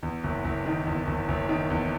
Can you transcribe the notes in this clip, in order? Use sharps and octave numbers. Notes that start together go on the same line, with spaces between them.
E2
F#1
F#1
D#3
E2
F#1
F#1
D#3
E2